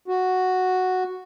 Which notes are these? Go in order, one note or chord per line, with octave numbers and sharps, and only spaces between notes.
F#4